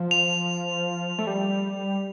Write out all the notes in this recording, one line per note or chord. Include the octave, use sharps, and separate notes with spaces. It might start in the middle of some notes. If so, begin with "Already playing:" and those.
Already playing: F3
F7
A3
G3